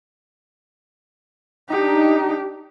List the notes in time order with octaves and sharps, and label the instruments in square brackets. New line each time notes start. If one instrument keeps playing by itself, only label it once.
[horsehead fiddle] D4 G4 [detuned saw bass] D#4